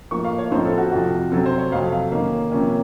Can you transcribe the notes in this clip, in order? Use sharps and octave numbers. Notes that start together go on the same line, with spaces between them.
A2 F3 A#3 C#6
F5
C#5
A2 F3 C4 D#4 C5
A4
F#4
F2 C3 F3 F#4
C3 F#3 C4 A4
C5
C#5
F2 C3 F#3 A3 F5
F5
D#3 A#3 C#4
C3 F3 A#3 C#4